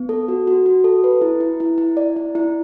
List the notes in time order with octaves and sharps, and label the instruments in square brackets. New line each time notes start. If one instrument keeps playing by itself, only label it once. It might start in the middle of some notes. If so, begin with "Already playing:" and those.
Already playing: [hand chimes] B3
A4
F#4
F#4
F#4
A4
B4
E4
E4
E4
E4
D5
E4
E4